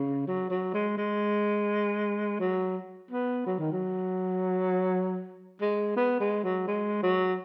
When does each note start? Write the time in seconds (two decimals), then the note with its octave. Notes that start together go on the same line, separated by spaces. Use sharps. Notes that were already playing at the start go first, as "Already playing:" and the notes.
Already playing: C#3
0.27 F#3
0.50 F#3
0.74 G#3
0.97 G#3
2.40 F#3
3.11 B3
3.46 F#3
3.59 D#3
3.72 F#3
5.61 G#3
5.96 B3
6.20 G#3
6.44 F#3
6.67 G#3
7.03 F#3